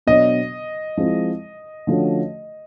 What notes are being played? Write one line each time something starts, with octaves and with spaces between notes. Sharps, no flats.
B2 F#3 B3 D4 D#5
F3 G#3 C4 E4
D3 F3 A3 C#4 F#4